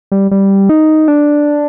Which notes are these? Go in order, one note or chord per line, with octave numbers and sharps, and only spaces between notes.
G3
G3
D#4
D4